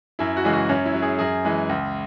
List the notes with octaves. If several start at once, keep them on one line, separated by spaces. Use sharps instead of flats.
F#2 E4
F#4
C#3 E3 G#3
F#4
F#2 C#4
E4
F#3
G#4
F#2 G#4
E3 G#3
C#2